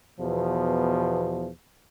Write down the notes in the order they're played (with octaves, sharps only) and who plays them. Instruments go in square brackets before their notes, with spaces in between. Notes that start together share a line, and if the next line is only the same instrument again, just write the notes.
[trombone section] E2 B2 F3